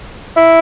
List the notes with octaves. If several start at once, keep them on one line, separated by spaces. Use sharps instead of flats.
E4